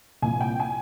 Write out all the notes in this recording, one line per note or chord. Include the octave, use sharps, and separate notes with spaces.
C2 A#2 F3 G#5
G5
G#5